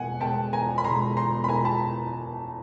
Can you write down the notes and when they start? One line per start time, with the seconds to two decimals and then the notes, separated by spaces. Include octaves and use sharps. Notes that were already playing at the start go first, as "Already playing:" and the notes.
Already playing: E2 B2 G#3 F#5 G#5
0.20 B2 G#3 G5 A5
0.52 E2 G#5 A#5
0.78 B5
0.84 B2 G#3 A#5 C6
1.17 E2 A#5 C6
1.44 B5
1.48 B2 G#3 G#5 A#5
1.65 A5 B5